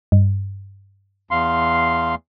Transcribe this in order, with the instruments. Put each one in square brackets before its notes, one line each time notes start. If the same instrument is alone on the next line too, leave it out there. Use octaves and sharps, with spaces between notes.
[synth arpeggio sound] G2
[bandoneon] E2 F5 C6